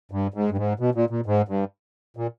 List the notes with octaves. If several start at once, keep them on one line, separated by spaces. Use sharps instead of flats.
G2
G#2
G2
G#2
B2
A#2
A#2
G#2
G2
A#2